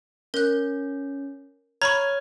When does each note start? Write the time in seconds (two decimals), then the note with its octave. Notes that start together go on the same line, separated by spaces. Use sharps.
0.34 C#4 A#4 F#6
1.82 C#5 A#5 B5 C#6 F6 G#6